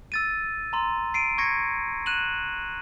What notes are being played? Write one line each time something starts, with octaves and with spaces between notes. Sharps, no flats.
E6 A6 D#7
A#5 C6
C7 D7 D#7
C#6 G#6 A#6 C#7
F#6 D#7 E7 F#7